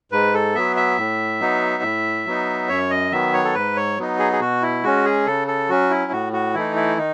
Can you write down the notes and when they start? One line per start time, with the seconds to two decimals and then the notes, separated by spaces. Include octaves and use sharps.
0.12 G#2 B4
0.34 A4
0.55 F#3 B3 E5
0.76 E5
0.98 A2
1.40 F#3 B3 D#4
1.83 A2
2.26 F#3 B3 D#4
2.69 F#2 C#5
2.90 D#5
3.12 D#3 F#3 B3 E5
3.33 C#5
3.45 A4
3.55 G#2 B4
3.76 C#5
3.97 F#3 B3 D#4
4.19 G#4
4.33 G#4
4.40 B2 F#4
4.62 E4
4.83 G#3 C#4 F#4
5.05 G#4
5.26 C#3 A4
5.48 A4
5.69 F#3 C#4 F#4
5.90 E4
6.12 A2 F#4
6.33 F#4
6.55 E3 A3 D#4 E4
6.76 E4
6.98 D#3 D#4